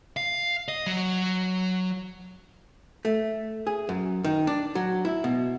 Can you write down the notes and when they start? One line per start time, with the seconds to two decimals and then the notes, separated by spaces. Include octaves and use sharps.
0.17 F5
0.68 D#5
0.87 F#3
3.05 A3
3.67 G#4
3.89 F#2
4.24 D#3
4.47 D4
4.75 F#3
5.05 E4
5.24 B2